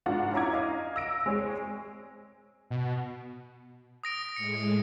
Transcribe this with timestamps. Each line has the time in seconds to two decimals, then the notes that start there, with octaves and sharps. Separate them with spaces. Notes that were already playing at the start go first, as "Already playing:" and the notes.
0.06 G#2 D4 F4 F#4 F#5
0.33 C#4 E4 A#5 D6 G#6
0.53 D#5 F5
0.96 E6 A#6 D7
1.26 G#3 C4 G#4 C#5
2.70 B2
4.04 D#6 A#6 D7
4.36 A2 G#3 C#7